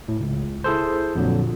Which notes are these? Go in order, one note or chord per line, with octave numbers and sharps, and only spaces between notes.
A2
C#2
E4 G#4 A4 C5
F2 A#2 D3 F#3